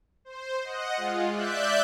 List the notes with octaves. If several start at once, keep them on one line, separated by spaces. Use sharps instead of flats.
C5
D#5 F#5
G#3 F4
D5 E5 F#6 G6